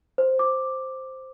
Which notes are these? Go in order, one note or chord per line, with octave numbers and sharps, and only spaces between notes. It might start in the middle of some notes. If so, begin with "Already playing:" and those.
C5
D6